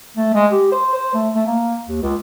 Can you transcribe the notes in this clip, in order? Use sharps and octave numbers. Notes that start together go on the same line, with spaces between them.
A3
G#3
G4
C5
C5
A3
A3
A#3
D#2
C#2